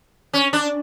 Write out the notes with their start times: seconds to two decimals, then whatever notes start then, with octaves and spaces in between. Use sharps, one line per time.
0.33 C#4
0.53 D4